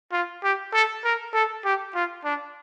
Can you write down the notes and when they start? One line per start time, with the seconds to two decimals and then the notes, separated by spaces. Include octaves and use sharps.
0.12 F4
0.44 G4
0.73 A4
1.04 A#4
1.34 A4
1.65 G4
1.95 F4
2.25 D4